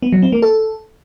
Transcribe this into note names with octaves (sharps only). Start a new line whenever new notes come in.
B3
F#3
C4
A#3
A4